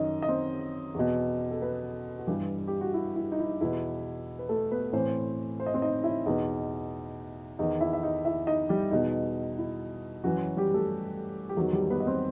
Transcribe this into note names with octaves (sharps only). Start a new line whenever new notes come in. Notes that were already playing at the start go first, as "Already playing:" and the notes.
Already playing: F#2 D#3 D#4 D#5
D#5
C4 C5
E2 B2
A4
B3 B4
F#4
G2 E3 G3 G4
G4
F#4
E4
E4
D#4
E4
E2 B2 E4
B4
A3 A4
B3 B4
A2 E3 C4 C5
C5
D#5
C4 C5
D#4 D#5
E4 E5
E2 B2 D#4 D#5
E2 D#3 D#4 D#5
E4 E5
E5
D#4 D#5
E4 E5
D#4 D#5
G3 G4
E2 B2 D#4
E4
F#2 E3 F#3 F#4
G3 G4
A3 A4
G4
E2 D#3 F#3 F#4
G3 G4
B3 B4
D#5
C4 C5